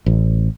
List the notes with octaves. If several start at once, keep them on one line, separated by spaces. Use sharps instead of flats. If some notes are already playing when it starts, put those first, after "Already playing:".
A1